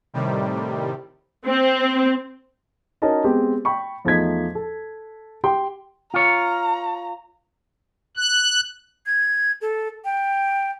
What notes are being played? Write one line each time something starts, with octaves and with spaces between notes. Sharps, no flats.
A2 C3 D#3 G3
C4
C#4 D#4 F#4 A#4 D#5 A5
G#3 B3 C4 G4 G#4
G5 B5 C#6
E2 F3 A3 D#4 G#6 B6
A4
G4 G5 C6
F4 C#5 A#5
F#6
G#6
A4
G5